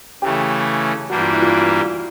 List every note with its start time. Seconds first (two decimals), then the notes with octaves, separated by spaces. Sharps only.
0.22 C#3 E3 A3 C#4 G4
1.10 G2 E3 G3 A#3 D4 F#4
1.21 F4
1.32 E4
1.42 F4